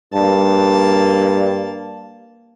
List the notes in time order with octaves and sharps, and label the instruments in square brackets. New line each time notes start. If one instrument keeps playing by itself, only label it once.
[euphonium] G2 [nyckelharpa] A#3 A5